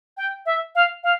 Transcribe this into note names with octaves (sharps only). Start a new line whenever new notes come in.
G5
E5
F5
F5